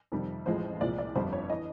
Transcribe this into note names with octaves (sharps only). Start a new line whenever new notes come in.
F2 C3 D#3 G3
A1 A2 F3 G#3 C5
C2 A#2 F3 G#3 D5
D5
G1 F2 D3 G3 C5
C#5
E3 D#5